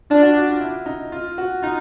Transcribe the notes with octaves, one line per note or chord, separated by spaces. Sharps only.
D4 F4
F#4
F#4
F4
E4
D#4
F4
F#4
D#4 F4